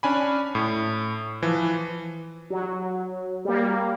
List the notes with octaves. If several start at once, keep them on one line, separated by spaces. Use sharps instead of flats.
C#4 D4 G#5 B5
A2
E3 F3
F#3
G3 A#3